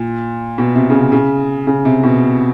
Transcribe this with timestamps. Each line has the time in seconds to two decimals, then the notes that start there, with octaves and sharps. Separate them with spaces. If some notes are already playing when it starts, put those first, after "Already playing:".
Already playing: A#2
0.58 B2
0.75 C3
0.90 C#3
0.94 C3
1.12 C#3
1.67 C#3
1.85 C3
2.03 B2